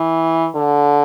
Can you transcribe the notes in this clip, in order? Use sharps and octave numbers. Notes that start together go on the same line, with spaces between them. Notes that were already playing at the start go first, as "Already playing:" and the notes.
Already playing: E3
D3